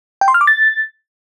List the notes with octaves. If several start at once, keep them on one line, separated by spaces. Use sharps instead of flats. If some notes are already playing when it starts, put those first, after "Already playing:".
G5
C6
F6
D6
A6